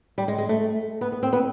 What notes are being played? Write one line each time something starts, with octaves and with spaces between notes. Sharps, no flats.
G3
G#3
G#3
A3
B3
B3
C4
B3